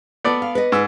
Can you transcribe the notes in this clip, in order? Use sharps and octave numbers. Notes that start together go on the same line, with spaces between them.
B3 A4 D5
F5
B4 D#5
G#2 E6